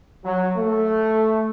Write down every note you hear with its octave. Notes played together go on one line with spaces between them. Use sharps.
F#3
A3